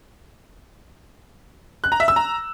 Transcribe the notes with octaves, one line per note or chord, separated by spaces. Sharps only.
F#6
A#5
E5
E6
A#5